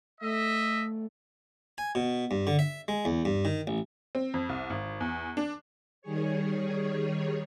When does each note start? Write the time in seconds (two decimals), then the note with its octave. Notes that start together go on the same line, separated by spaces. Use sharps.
0.21 A3 D#5 E5
1.78 G#5
1.95 B2
2.31 G2
2.47 D3
2.59 E5
2.88 G#3
3.05 E2
3.25 G2
3.45 D#3
3.67 A1
4.15 C4
4.34 F2
4.49 C2
4.70 G#1
5.00 E2
5.37 D4
6.02 D#3 G3 G#4 C#5